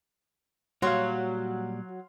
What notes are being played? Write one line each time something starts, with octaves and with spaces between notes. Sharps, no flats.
A#2 F#3 G3 F#4 F5 C6